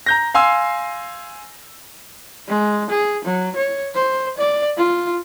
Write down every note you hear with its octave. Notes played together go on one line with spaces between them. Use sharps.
A#5 G6 A#6
F5 G#5 C6 E6
G#3
G#4
F#3
C#5
C5
D5
F4